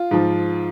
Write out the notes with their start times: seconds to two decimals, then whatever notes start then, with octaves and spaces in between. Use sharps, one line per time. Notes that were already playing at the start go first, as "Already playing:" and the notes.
Already playing: F4
0.11 G#2 F3